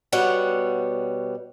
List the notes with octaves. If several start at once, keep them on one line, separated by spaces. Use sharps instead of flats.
B2 G3 C#5 F#5